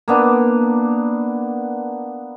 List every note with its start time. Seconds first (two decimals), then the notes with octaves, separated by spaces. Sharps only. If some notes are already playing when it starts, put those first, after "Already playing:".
0.08 A#3 B3 D4